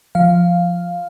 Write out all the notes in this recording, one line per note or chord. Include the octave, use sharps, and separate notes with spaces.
F3 F5